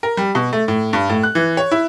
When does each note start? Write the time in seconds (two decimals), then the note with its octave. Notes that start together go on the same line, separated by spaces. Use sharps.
0.03 A#4
0.17 G3
0.35 B2
0.53 A3
0.68 A2
0.93 G2
1.09 A2
1.23 F#6
1.35 E3
1.57 C#5
1.71 E4